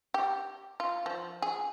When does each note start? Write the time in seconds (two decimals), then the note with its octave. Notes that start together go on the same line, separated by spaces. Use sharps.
0.14 G4
0.80 F4
1.06 F3
1.42 G#4